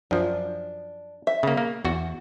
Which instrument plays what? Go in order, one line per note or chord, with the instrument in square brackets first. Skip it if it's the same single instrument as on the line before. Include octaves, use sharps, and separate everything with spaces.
[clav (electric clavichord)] F#2 F3 [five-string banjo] D4
[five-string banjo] E5
[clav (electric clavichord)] C#3 A#3
A#3
E2 F#4